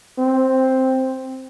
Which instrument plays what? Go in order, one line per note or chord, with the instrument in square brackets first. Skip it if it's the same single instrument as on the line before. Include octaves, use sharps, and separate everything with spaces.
[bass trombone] C4